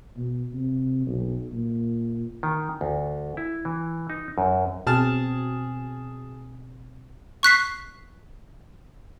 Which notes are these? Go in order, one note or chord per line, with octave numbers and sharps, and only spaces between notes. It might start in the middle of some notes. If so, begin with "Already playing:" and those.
B2
C3
B1
A#2
D#3
D2
E4
E3
D#4
F#2
B2 C4 G#4 A5 F6
C#6 F#6 B6 C7